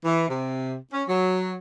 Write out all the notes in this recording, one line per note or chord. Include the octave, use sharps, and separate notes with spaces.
E3
C3
C#4
F#3